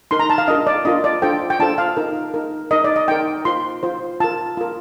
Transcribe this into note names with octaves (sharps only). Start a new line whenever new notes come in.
D#4 A#4 C6
A#5
A5
F5
D4 F4 A#4 D#5
D5
D4 F4 A#4 D#5
D5
D4 F4 A4 C5 G5
G5
D4 F4 A4 C5 A5
F5
D#4 A#4
D#4 A#4
D#4 A#4 D#5
D5
D#5
D#4 A#4 G5
F4 C5 C6
F4 C5
F4 A#4 A5
F4 A#4